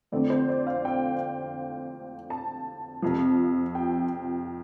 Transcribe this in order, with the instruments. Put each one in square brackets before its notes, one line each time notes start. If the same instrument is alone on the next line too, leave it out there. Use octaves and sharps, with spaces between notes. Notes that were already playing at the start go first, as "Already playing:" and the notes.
[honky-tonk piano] F2 D3 A3 C4 D5
C5
D5
F5
G5
A5
F2 C3 F3
G5